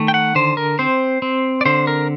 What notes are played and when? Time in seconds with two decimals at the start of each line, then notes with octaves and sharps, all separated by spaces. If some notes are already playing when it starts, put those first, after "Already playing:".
Already playing: D#3 A3
0.08 G5
0.14 F#5
0.35 D3 C5
0.57 A#4
0.79 C4 C5
1.22 C4
1.61 D5
1.66 D3 C5
1.87 A#4